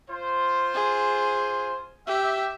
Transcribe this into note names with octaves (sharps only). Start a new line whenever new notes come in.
F4 C5
G#4
G4 E5